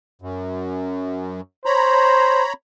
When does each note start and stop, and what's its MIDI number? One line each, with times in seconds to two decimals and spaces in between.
0.22 1.41 42
1.66 2.44 72
1.66 2.53 73
1.66 2.53 82
1.66 2.53 83